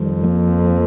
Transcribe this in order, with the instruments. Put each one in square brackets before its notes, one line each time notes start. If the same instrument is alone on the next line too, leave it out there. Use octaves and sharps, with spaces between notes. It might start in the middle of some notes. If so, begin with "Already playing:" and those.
Already playing: [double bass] F2 [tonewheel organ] D#3 G3
[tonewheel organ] F3 A#3